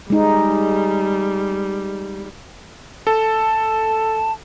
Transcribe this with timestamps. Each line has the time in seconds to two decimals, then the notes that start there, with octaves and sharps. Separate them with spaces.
0.10 G3 G#3 D#4
3.07 A4 A5